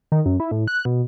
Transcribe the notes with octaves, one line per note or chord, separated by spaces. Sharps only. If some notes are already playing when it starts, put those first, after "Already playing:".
D#3
F#2
E4
A2
F#6
B2